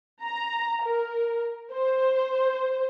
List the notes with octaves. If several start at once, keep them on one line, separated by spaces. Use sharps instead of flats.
A#5
A#4
C5